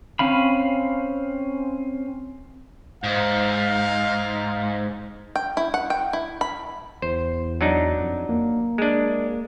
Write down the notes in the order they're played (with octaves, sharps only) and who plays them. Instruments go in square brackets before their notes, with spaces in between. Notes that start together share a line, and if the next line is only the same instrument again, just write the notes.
[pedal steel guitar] C4 C#4 F5 B5
[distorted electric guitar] G#2 [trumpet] F5
[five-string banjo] G5
E4
F#5
G5
E4
B5
[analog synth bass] E2 [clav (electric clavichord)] C5
[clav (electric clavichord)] F#3 D4 D#4
[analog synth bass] F2
A#3
[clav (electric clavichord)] G#3 D4